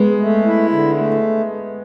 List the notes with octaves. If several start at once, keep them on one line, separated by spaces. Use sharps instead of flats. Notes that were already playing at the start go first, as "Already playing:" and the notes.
Already playing: G#3 B3
A3
E4
D3
A3